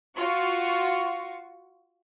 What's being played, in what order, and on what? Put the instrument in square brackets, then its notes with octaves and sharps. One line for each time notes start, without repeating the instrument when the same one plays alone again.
[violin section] F4 F#4 C#6